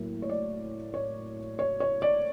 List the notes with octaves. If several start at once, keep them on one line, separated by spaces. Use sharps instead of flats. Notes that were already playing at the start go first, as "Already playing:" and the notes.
Already playing: A2 F#3 A#3
C#5
D5
C#5
C#5
C#5
D5